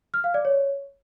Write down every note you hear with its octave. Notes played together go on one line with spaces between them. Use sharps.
F6
F5
D5
C#5